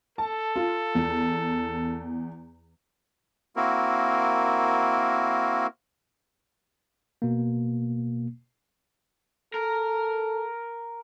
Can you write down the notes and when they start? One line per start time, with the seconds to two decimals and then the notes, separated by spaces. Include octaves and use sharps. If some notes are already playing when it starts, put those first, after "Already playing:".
0.18 A4 A5
0.56 F4
0.95 E2
3.56 A#3 C4 E4 F#4 A#4
7.22 B2 A#3
9.54 A4 A#4